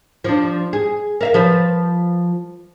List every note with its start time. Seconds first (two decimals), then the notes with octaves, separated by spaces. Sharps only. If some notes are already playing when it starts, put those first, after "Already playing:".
0.24 F3 D4
0.73 G#4
1.21 A#4 E5 F5
1.34 F3 B4 C5